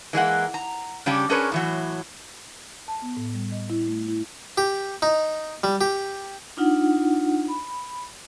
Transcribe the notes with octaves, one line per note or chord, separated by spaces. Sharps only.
E3 G#3 A#3 F#5
A#5
C#3 G3 C#4 D4 G4
C#4 D4 G#4 A#4 B4 C#5
A2 E3 F#3
A5
B3
A2
G3
D#5
E4
A3
E4
G4
D#4
G3
G4
D4 D#4 F4 F#5
B5